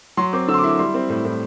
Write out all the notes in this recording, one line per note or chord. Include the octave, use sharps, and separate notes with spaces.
F#3 C6
C4 D6
D3 E6
C6
D6
E4
D6
G3 C6
C4
A2
A2